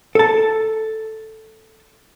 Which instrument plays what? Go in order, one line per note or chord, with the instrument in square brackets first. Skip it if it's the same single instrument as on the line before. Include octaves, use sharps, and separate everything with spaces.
[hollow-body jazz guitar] A4 A5